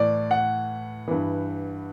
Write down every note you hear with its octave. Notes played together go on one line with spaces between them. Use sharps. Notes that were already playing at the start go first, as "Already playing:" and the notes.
Already playing: A2 E3 D5
F#5
G2 E3